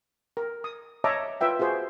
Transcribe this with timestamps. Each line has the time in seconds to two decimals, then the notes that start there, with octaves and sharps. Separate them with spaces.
0.37 A#4
0.64 D#6
1.04 C#5 D#5 E5 A5 A#5 D6
1.41 F4 B4 E5 G5
1.59 F4 F#4 G#4 C5